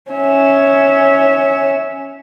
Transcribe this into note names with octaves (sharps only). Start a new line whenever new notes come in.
C#4 E5